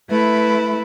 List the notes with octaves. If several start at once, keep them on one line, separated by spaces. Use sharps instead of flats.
A3 E4 B4